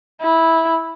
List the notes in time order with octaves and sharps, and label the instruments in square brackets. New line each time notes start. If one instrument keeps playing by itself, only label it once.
[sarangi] E4